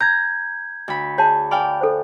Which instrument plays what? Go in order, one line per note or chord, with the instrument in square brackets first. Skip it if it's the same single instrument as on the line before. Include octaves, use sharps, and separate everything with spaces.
[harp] A#5 [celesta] G6 G#6
[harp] D2 B5
[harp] G#4 [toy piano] C#5 A5
[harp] D5 F5 G5 [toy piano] G#5 B5
[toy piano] A4 C5